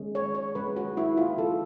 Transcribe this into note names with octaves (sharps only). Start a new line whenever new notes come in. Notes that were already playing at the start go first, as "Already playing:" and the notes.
Already playing: D#3 G#3 C#4
C#5
C#5
D#3 G#3 C#4 B4
F#4
E4
F4
D#3 G#3 C#4 A4